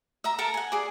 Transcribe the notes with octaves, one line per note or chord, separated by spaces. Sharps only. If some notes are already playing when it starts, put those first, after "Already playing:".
E5 A#5
A4 A#4 A5 A#5
F#5 G#5
G#4 D5